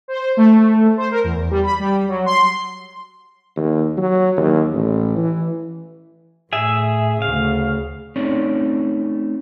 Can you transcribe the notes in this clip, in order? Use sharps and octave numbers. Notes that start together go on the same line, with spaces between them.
C5
A3
C5
A#4
E2
G3
B5
G3
F#3
C6
D#2
F#3
D#2
A1
E3
A2 G#4 E5
D2 C#3 F5
A3 C4 C#4 D#4 C#5 D5